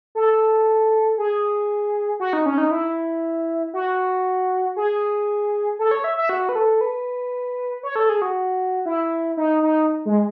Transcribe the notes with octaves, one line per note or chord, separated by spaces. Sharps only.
A4
G#4
F#4
D#4
C#4
D#4
E4
F#4
G#4
A4
C#5
E5
E5
F#4
B4
A4
B4
C#5
A4
G#4
F#4
E4
D#4
D#4
G#3